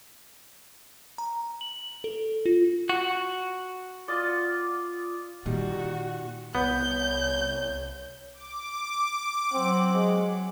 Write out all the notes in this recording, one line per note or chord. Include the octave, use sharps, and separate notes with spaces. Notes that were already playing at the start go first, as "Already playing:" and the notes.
A#5
F#7
A4
F4
F#4
F4 D5 D#5
A#2 D#3 G3 F#4
C2 B3 C#5 G6
D6
F#3 C4 F#5
G#3